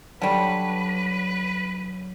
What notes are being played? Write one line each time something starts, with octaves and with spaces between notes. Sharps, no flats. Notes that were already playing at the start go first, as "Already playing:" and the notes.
D3 F#3 G3 B4 C#5